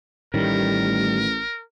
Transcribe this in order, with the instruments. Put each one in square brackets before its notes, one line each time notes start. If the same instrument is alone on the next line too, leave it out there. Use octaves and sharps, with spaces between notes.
[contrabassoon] A1 [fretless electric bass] A2 D#3 [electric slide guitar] G3 [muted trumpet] A#4